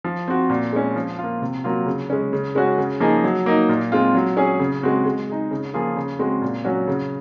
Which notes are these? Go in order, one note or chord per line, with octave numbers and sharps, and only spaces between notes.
F3
C4 F#4
A#2
G#3 C#4
F3
A#3 F4
C3
F#3 A#3 F4
C#3
G#3 C#4
C#3
G#3 C#4 F#4
C#3
F3 A#3 D#4 G#4
F#3
A#3 D#4
A#2
G#3 C4 F4
F#3
C#4 G#4
C#3
G#3 C4 F#4
G#3
D#4 G#4
C#3
F3 A#3 F4 G#4
C#3
G#3 C4 F#4
A#2
F#3 C#4 F#4
C#3